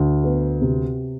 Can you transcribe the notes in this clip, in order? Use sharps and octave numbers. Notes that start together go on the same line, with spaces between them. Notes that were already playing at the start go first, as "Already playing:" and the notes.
Already playing: D2
B3
C3